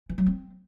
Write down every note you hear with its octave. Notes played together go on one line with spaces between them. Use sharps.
E3
F#3
C4